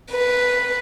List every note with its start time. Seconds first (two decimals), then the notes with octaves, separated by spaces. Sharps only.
0.12 B4